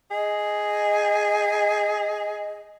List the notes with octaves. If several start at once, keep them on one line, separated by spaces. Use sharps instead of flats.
G#4 D#5